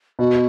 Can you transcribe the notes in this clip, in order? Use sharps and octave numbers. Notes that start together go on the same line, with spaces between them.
B2 F#4